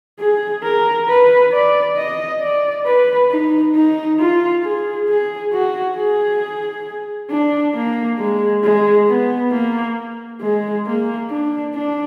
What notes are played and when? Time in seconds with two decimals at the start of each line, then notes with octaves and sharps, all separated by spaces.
0.19 G#4
0.64 A#4
1.09 B4
1.53 D5
1.97 D#5
2.42 D5
2.86 B4
3.31 D#4
3.75 D#4
4.20 F4
4.63 G#4
5.09 G#4
5.53 F#4
5.97 G#4
7.31 D4
7.75 A#3
8.19 G#3
8.64 G#3
9.08 B3
9.52 A#3
10.42 G#3
10.86 A#3
11.30 D4
11.75 D4